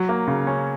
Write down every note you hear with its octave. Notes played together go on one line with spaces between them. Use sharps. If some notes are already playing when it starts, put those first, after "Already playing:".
Already playing: F#3
A#3
C#3
C#4